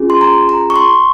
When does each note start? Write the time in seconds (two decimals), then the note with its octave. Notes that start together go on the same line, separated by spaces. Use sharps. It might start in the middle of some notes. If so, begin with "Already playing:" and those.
Already playing: C#4 F4 G#4
0.10 C6
0.21 A#5
0.49 A#5
0.70 C#6
0.76 C6